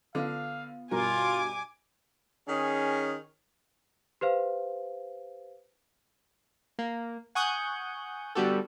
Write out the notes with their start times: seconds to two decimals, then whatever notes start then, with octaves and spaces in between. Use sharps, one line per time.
0.15 D3 B3 F4 F5
0.91 G2 B2 F4 A#4 G#5 D6
2.46 D#3 C#4 G#4
4.21 G4 B4 C5 F5
6.79 A#3
7.35 F#5 G#5 C#6 D#6 F#6 G6
8.35 D3 G3 B3 F#4 G4 A4